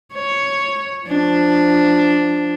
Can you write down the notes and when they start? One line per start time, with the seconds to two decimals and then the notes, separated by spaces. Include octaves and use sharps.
0.14 C#5
1.06 F3 D4